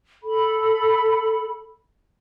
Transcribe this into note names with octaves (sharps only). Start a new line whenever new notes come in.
A4 B5